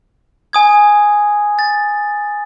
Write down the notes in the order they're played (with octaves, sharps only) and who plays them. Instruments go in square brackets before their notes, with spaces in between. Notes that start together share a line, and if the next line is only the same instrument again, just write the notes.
[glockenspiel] G#5 D#6 G#6
A6